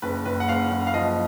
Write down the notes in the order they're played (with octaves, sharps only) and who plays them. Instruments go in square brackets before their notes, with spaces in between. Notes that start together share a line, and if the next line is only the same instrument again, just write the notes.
[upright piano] F#1 [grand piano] B4
[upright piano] F#1 [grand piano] B4
[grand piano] F#5
[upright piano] F#1 [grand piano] F5
[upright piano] F#1
[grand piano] F5
[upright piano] F3 [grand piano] D#5